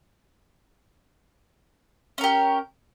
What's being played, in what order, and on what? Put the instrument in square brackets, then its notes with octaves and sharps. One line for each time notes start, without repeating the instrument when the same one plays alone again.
[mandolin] C#4
A#4
G4